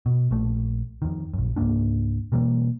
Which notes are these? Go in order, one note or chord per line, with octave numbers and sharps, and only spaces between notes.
B2
A#1 A3
F2 D#3
A#1 F#2
C#2 G#2 A#3 D4
B2 E3 G3 A#3